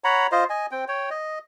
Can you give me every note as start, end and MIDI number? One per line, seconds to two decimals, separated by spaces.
0.04 0.27 73
0.04 0.27 78
0.04 0.27 82
0.04 0.27 83
0.32 0.44 65
0.32 0.44 72
0.32 0.44 75
0.50 0.66 75
0.50 0.66 80
0.71 0.85 60
0.71 0.85 79
0.88 1.10 73
0.88 1.10 79
1.10 1.39 75